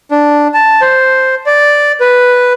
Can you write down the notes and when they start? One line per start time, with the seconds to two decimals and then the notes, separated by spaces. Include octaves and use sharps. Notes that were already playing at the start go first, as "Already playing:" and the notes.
0.11 D4
0.54 A5
0.82 C5
1.46 D5
2.00 B4